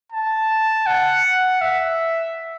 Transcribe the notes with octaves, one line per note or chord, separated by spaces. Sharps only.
A5
F#5
E5